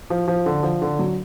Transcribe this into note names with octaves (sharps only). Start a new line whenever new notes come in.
F3
F3
D3
F3
D3
F#3